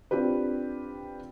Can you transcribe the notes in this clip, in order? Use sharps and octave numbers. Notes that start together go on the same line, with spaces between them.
C4 D4 F4 G4 B4